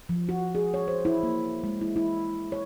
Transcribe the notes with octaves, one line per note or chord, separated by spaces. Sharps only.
F3
F#4
G#4
C#5
C5
E4
A#3
G#3
E4
E4
C#5